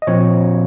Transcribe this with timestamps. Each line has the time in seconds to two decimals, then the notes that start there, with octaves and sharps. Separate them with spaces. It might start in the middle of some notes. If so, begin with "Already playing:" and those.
0.02 D#5
0.07 A#2 F3 C4 C#5